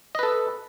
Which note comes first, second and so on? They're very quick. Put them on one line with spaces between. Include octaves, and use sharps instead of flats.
D#5 B4 A4